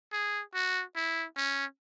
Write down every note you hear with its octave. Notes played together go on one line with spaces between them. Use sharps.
G#4
F#4
E4
C#4